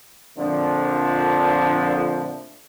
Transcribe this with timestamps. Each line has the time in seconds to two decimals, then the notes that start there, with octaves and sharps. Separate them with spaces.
0.37 F2 A#2 D3 F3 A3 D4